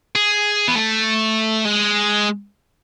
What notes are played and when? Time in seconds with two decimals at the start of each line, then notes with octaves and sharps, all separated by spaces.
0.16 G#4
0.68 B3
0.75 A3
1.65 G#3